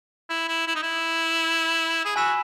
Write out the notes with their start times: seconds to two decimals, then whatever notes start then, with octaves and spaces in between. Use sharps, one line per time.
0.30 E4
0.48 E4
0.67 E4
0.75 D#4
0.83 E4
2.05 G#4
2.16 F#4 G#5 B5 E6 B6 E7